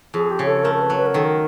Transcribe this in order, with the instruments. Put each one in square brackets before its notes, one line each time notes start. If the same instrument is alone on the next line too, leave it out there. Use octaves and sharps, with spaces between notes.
[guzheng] F2 [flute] G#4
[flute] G4
[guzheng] C#3
[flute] A4
[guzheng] A3 [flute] A#4
[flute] A#4
B4
[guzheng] F#3
[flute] B4
A#4
[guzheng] D#3 [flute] A4
[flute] A#4